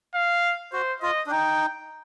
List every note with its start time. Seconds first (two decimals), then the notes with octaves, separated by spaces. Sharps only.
0.14 F5
0.73 F#4 C5
1.02 F4 D#5
1.27 D4
1.31 D#4 G5